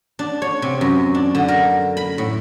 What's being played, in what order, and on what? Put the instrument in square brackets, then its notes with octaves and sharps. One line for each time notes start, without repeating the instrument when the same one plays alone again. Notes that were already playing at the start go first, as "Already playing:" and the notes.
[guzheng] D4
C#5
C3
F#2
D4
D3
A#4
B5
A2